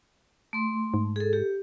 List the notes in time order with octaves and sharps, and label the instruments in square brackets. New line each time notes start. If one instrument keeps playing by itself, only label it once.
[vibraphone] A3 C6
[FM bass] G#2
[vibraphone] G#4 A4
G4